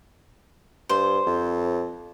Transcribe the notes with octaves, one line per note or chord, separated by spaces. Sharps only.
G2 C5
F2